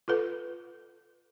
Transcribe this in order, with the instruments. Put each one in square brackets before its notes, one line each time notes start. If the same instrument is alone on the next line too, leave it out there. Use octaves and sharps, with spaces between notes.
[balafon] F4 A4 B4